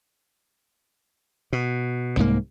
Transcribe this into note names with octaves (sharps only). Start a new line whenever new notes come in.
B2
C2 G#2 A#3